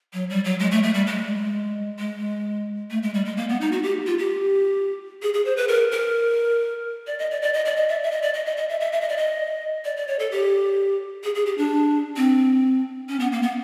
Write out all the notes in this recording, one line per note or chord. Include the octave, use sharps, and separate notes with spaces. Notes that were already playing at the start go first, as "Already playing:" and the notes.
F#3
G3
F#3
G#3
A3
A3
G3
G#3
G#3
A3
G#3
G3
G#3
A#3
B3
D#4
F#4
G4
F4
G4
G#4
G#4
C5
B4
A#4
A#4
D5
D#5
D5
D5
D#5
D5
D#5
E5
E5
D#5
D5
D#5
D#5
D#5
E5
E5
E5
D#5
D5
D#5
D5
D5
C#5
A4
G4
G#4
G#4
G4
D4
C4
C#4
B3
A#3
B3